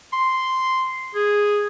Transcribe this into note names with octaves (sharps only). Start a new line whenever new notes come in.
C6
G#4